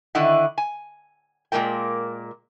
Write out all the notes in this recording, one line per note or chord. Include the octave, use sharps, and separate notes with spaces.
D3 D#3 E4 D#5 F#5
G#5
A#2 G#3 A#3 A#4 G5